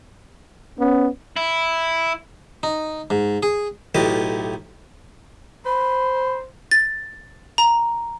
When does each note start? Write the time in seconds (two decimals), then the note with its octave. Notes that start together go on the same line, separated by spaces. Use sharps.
0.79 B3 C#4
1.37 E4
2.63 D#4
3.10 G#2
3.43 G#4
3.95 B1 A2 G4 D#5
5.66 C5 B5
6.71 A6
7.58 A#5